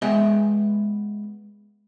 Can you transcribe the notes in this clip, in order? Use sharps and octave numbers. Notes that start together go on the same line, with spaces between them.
G#3 B3 D#5 E5 G5